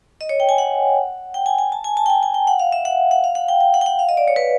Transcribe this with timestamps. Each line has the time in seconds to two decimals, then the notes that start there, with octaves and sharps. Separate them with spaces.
0.21 D#5
0.29 C#5
0.40 G5
0.49 G#5
0.58 F#5
1.34 G5
1.46 G#5
1.59 G#5
1.72 A5
1.84 G#5
1.97 A5
2.06 G5
2.10 G#5
2.23 G#5
2.34 G5
2.47 F#5
2.60 F5
2.72 E5
2.85 F#5
3.11 F#5
3.24 F5
3.35 F#5
3.48 G5
3.61 G5
3.74 F#5
3.81 G5
3.86 F#5
3.99 F5
4.09 D#5
4.17 D5
4.28 C#5
4.36 B4